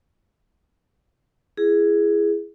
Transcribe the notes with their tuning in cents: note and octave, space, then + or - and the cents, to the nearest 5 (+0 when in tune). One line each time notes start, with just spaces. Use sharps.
E4 +25 G#4 +0